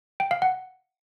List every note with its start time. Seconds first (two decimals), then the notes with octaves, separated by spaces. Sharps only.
0.20 G5
0.31 F5
0.42 F#5